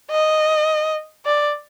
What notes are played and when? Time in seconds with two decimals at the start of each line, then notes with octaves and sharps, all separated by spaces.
0.11 D#5
1.25 D5